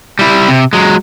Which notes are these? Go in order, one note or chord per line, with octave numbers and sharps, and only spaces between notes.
G3 E4
C3
F#3 G#3